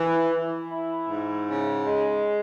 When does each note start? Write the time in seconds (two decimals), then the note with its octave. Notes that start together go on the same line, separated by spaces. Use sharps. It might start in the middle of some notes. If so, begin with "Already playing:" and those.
Already playing: E3
0.33 E3
0.71 E4
1.09 G#2
1.48 C#3
1.86 G#3